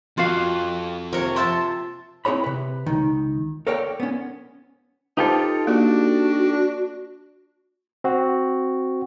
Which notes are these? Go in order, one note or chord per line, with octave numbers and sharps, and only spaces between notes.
F2 F4 F#4 F5
C3 F3 A#3 A#4 C#5
C5 E5 A5
C4 E4 G#4 C#5 B5
C3 B4
C#2 D#3
A4 A#4 C#5 D5 F5 G5
B3 C#4
D#4 F4 G4 A4 B4 C5
A#3 D4 F#4 G#4
C4 F#4